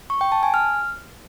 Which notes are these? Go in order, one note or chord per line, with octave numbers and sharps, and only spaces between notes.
C#6
G5
A5
G#5
F6